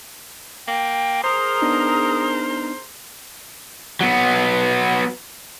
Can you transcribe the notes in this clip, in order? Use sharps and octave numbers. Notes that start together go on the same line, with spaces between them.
A#3 G5
G#4 A#4 C5 A#5 D#6
B3 D4 D#4
F#3 B3